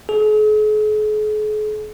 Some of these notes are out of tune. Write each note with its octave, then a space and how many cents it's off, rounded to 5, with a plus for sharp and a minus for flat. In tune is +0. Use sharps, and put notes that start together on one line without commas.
G#4 +45